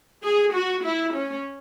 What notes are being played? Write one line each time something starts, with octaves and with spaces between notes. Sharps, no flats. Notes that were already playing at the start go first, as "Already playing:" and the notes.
G#4
F#4
E4
C#4